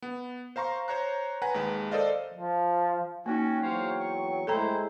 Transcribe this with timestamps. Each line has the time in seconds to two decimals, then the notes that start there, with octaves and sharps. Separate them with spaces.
0.02 B3
0.56 C5 F5 A#5 C6 C#6
0.88 C5 C#5 A#5 F#6
1.42 B4 F#5 G#5 A#5
1.54 D#2 G#3 B4
1.91 A4 A#4 C5 D5 D#5 F5
2.34 F3
3.26 A#3 C#4 D#4 F#4 G5
3.62 E2 F#3 C5 C#5 F5
4.00 C#6
4.47 A2 G#3 E4 A4 C5 G5 A#5